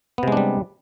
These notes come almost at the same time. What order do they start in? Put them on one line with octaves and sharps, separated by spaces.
B3 C3 G#3 D4 G3